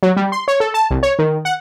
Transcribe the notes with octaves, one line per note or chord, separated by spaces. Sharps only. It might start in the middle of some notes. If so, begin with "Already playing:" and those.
F#3
G3
C6
C#5
A4
A5
C2
C#5
D#3
F#5